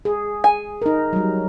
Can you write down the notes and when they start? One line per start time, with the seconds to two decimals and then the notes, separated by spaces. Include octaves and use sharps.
0.05 G#4
0.44 G#5
0.82 D#4 A#4
1.13 F#3 G3